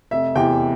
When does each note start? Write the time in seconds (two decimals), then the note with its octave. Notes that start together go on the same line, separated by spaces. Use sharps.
0.11 F1 E5
0.35 E2 C3 E3 G5